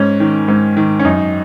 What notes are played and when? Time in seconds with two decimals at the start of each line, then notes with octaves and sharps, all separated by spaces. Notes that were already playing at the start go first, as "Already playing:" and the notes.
Already playing: G#2 C#4
0.20 D#3
0.48 G#2
0.77 D#3
0.99 C#4
1.04 F#2 D#4